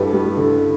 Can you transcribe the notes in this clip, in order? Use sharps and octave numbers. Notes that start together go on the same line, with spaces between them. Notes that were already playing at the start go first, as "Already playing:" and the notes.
Already playing: A1 G2 G4 A4 B4
G3
D3